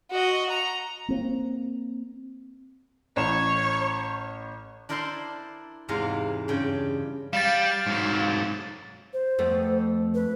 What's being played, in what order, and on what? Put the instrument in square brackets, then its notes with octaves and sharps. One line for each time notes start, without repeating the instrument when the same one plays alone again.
[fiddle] F#4 D#5
A#5
[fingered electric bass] A#3 C4
[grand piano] A1 E7 [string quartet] C#5
[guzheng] D4 E4 A#4 C5 A5 C6
E2 G#2 C3 E3 F5 A#5
G2 C#3 G5
[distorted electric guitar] G3 [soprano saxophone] F5 [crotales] A6 E7
[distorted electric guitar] G#2 F#3
[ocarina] C5
[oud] F2 A3 B3
[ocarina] B4